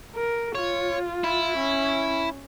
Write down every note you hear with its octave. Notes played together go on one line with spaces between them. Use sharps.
A#4
F4 C#5
E4
C#4